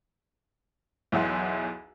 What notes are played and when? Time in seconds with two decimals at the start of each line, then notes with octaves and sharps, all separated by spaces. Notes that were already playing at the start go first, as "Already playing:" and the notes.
1.12 B1 E2 E5 F#5 C6